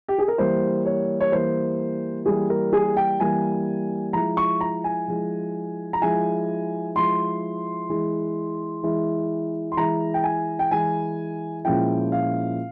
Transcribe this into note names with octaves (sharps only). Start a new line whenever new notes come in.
G4
G#4
A#4
E3 G3 A#3 C5
C#5
C#5
E3 G3 A#3 C5
E3 G3 A#3 G#4
A#4
G#4
G5
E3 G3 A#3 G#5
F3 G#3 E4 A#5
C#6
A#5
G#5
F3 G#3 E4
A#5
F3 G#3 E4 G#5
F3 G#3 E4 C6
E3 G#3 E4
E3 G#3 E4
C6
E3 G#3 E4 A#5
G5
G#5
G5
E3 G#3 E4 G#5
A#2 F3 G#3 C#4 E4 G5
F5